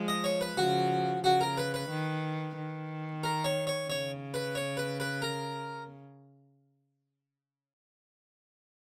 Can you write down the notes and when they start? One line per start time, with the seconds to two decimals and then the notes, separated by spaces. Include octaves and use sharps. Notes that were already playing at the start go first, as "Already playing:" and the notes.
Already playing: F3 G#3
0.08 D#5
0.24 C#5
0.41 B4
0.57 C#3 F3 F#4
1.24 C#3 F#4
1.41 A#4
1.58 B4
1.74 B4
1.90 D#3
2.57 D#3
3.24 A#4
3.44 C#5
3.67 C#5
3.89 C#3 C#5
4.34 B4
4.55 C#5
4.77 B4
5.00 B4
5.22 A#4